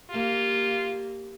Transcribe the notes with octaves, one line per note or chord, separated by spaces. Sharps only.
A#3 F4 G4